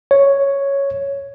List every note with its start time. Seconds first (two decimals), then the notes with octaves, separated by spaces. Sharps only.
0.11 C#5